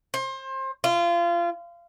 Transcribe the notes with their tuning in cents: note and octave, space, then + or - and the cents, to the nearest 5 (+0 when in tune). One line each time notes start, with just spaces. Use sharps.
C5 +30
F4 -25